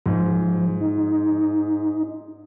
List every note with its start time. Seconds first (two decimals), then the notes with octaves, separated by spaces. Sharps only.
0.06 G#2 F3
0.81 D#4